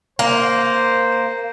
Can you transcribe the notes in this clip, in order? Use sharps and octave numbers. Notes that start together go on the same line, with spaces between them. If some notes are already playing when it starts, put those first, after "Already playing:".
A#3 C5